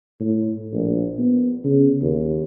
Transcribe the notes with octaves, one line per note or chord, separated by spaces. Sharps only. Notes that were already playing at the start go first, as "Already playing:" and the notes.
A2
A#1
B3
C#3
D#2